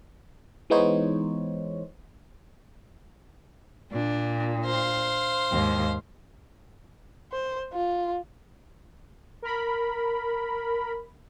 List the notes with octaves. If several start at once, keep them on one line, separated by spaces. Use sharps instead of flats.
E3 G#3 B3 D#4 C5 C#5
A#2 D4
C5 F5
D#2 G#2
C5
F4
A#4 B5